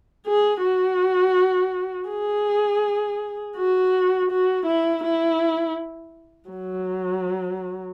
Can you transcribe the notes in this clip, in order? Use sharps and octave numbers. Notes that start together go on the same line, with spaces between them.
G#4
F#4
G#4
F#4
F#4
E4
E4
F#3